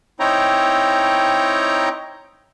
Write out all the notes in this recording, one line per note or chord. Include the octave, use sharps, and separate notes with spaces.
C4 D#4 E4 C#5 G5 A#5